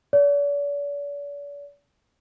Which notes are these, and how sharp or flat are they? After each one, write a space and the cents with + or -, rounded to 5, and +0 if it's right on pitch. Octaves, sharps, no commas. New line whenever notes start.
D5 -45